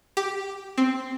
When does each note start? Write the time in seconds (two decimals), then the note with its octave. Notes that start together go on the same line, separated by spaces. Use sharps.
0.17 G4
0.78 C4